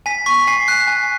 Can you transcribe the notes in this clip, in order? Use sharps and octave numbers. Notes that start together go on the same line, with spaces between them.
G#5 B6
C#6 B6
G#5 C7
F#6 C7
G#5